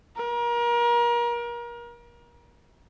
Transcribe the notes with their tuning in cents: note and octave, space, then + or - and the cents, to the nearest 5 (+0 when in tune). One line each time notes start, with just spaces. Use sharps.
A#4 +30